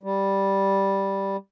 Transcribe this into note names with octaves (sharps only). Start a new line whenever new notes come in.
G3